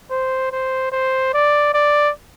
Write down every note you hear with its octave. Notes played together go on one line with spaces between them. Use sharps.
C5
C5
C5
D5
D5